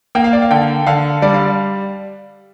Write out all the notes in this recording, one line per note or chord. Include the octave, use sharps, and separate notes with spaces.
A#3 G5
F5
D5
F5
D3 G5
D3 F5
G3 D5
F5